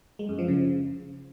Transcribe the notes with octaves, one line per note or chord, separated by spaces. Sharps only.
G#3
F#2
F3
C#3